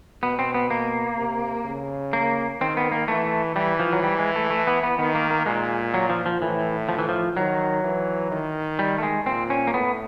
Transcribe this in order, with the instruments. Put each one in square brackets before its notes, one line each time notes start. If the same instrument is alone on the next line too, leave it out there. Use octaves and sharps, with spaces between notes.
[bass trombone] B2 [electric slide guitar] B3
[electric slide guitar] C4
B3
A#3
[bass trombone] C3
C#3
[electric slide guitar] A#3
[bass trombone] D#3 [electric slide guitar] C4
[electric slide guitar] B3
A#3
[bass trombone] E3 [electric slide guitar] A3
[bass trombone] E3 [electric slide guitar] G3
[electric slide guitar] F3
F#3
G3
G#3
A3
A3
B3
B3
[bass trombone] D#3 [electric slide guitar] B3
[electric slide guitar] A#3
A#3
[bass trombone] A#2 [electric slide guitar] G#3
[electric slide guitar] F#3
F3
F3
[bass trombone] A2 [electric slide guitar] E3
[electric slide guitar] F3
E3
F3
[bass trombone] D#3 [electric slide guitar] F#3
[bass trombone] E3
D#3
[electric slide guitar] G3
A3
G#3
[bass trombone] A#2 [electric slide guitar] C4
[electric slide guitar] C#4
A#3
[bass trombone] A2 [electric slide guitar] B3